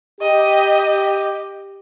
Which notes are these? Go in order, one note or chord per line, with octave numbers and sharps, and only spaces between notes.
G4 D#5